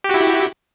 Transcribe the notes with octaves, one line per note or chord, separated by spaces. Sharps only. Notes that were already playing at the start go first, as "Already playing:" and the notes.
E4 F#4 G4